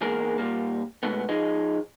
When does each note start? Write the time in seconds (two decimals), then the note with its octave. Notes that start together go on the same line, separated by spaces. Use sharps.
0.01 E2 G#2 G#3 A#3 G#4 A#4
0.38 A#2 G3 A#3
1.03 B2 G#3 A3 B3
1.29 F3 D#4 G#4 D#5